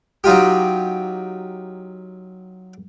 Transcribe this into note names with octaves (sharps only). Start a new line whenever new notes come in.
F#3 D#4 F4 G4